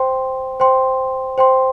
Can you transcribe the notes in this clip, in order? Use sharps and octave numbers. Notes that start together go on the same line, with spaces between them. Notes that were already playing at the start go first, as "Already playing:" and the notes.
Already playing: C5 G5 C6
C5 G5 C6
C5 G5 C6